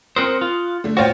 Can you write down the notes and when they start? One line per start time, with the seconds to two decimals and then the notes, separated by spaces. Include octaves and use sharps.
0.16 C4 A#4 C5 D#6 F#6 C#7
0.41 F4
0.84 D3 A3
0.97 A#2 F4 F#4 C5 C#5 G5